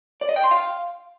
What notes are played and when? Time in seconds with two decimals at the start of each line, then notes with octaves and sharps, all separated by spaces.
0.21 D5
0.29 D#5
0.36 G5
0.44 C6
0.51 F5